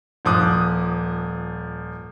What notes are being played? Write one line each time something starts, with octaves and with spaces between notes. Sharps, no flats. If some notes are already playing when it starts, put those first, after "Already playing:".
D#1 F3 D6 D#6 F#6